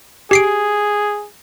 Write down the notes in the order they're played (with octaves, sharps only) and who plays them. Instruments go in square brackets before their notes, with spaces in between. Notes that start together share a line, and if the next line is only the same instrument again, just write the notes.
[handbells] G4 C7 D7 [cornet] G#4